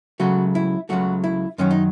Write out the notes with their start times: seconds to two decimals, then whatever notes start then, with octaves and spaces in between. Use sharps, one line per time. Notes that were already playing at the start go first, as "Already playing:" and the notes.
0.20 C#2 C#3 F#3 A3 F#4
0.55 E4
0.89 C#2 C#3 F#3 A3 F#4
1.24 E4
1.58 F#2 D#3 F#3 C#4
1.71 D#4